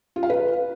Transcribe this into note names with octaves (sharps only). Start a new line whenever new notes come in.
F4
F5
B4